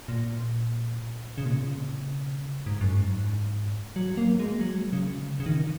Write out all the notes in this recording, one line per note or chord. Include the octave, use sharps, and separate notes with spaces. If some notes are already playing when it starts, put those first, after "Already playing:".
A#2
C#3
A#2
C#3
G#2
F#2
G#2
F#3
A#3
G#3
F#3
C#3
C#3
D#3